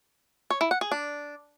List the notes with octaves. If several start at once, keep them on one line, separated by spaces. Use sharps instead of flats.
C#5
E4
F#5
G#4
D4